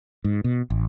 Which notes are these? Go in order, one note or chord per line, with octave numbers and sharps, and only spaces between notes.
G#2
B2
A1